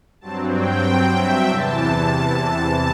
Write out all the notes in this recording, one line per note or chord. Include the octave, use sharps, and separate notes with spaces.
G2 F#3 C4 A5
G5
E5
E2 C3 E3 A5
A5